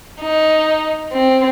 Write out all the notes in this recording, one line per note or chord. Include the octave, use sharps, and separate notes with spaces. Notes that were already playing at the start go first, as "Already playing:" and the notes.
D#4
C4